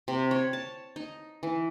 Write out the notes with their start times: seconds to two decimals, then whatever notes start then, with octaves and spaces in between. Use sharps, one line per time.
0.08 C3
0.31 C#5
0.53 A5
0.96 D#4
1.43 E3